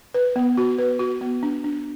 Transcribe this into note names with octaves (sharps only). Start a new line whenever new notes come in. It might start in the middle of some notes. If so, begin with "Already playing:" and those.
B4
B3
F#4
B4
F#4
B3
D4
D4